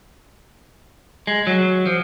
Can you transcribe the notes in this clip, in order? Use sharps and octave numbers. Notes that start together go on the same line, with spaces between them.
G#3
F#3
F3